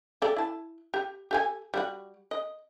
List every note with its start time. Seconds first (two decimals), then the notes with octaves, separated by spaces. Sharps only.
0.22 G4 A4 D5
0.37 E4 A5
0.94 G4
1.31 G4 A4 G#5
1.74 G3 F#4
2.31 D#5